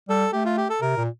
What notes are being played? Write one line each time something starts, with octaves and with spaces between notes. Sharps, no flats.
G3 A4
A3 G4
F4
G4
A4
C3 A#4
A#2